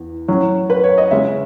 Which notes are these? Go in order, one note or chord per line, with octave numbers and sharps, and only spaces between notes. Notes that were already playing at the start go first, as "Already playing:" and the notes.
Already playing: E2
A2 F#3 C#4
B4
C#5
D#5
C#3 G#3 C#4 E5